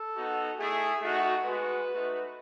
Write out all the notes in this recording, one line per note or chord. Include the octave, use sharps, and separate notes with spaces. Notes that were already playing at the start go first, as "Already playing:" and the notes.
Already playing: A4
B3 D#4 F#4
A3 E4 G#4
A3 D#4 F#4
G#3 B3 F#4 B4
A3 D#4 F#4